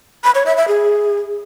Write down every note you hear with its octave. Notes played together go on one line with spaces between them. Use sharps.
B5
C#5
E5
E5
G#4